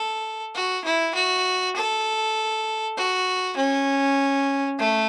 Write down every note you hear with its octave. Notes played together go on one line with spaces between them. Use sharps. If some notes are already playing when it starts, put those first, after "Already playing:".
Already playing: A4
F#4
E4
F#4
A4
F#4
C#4
A3